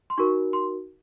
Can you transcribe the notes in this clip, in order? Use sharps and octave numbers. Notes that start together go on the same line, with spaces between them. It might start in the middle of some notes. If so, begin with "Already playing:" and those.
C6
D#4 F#4 A#4 C#6
C6